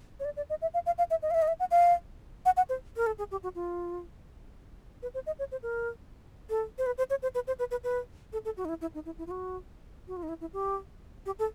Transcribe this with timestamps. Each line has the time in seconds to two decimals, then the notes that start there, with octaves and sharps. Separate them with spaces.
0.20 C#5
0.25 D5
0.37 D5
0.50 D#5
0.62 E5
0.74 F5
0.86 F5
0.98 F5
1.10 E5
1.22 D#5
1.31 F5
1.34 E5
1.42 D#5
1.48 E5
1.60 F#5
1.71 F5
2.46 F#5
2.57 F#5
2.69 C5
2.97 A#4
3.07 A4
3.18 G#4
3.31 G4
3.43 F#4
3.55 F4
5.02 B4
5.14 C5
5.26 D#5
5.39 C#5
5.52 C5
5.63 A#4
6.50 A4
6.78 C5
6.86 B4
6.98 C5
7.10 C#5
7.23 C5
7.35 B4
7.47 C5
7.59 B4
7.71 B4
7.84 B4
8.33 A4
8.45 A4
8.57 F#4
8.65 D#4
8.69 E4
8.81 E4
8.94 D#4
9.06 E4
9.18 E4
9.27 F4
9.31 F#4
10.08 F#4
10.17 F4
10.23 D#4
10.29 E4
10.41 E4
10.53 G4
11.26 G4
11.39 A4